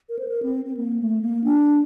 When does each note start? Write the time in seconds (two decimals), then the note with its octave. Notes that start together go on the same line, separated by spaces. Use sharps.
0.09 A#4
0.19 C5
0.28 A#4
0.43 C4
0.65 C4
0.77 A#3
0.99 A3
1.21 A#3
1.44 D4